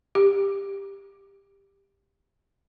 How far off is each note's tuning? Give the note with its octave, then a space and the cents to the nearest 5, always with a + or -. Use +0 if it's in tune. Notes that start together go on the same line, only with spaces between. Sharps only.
G4 +15